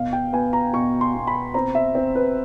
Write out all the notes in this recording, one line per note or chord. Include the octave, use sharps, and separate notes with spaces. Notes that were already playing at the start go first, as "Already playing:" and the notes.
Already playing: B2 F5
G5
B3 G#5
A#5
B2 C#6
C6
B2
B5
C4 A#5
E5
C4
B4